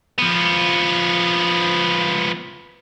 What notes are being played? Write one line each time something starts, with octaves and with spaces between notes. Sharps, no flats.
F3 B3